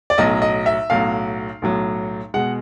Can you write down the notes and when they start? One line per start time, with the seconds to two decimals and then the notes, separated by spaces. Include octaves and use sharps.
0.10 D5
0.18 B1 A2 F#3 D#5
0.42 D#5
0.66 E5
0.90 B1 A2 F#3 F5
1.62 B1 A2 F#3
2.34 B2 G#3 F#5